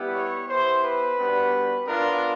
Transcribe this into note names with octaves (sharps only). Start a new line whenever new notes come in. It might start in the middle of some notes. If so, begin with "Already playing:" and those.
Already playing: G3 B3 E4 G4
C#5
B3 E4 G4 C5
B4
G3 B3 D4 F#4
B3 D4 F4 A#4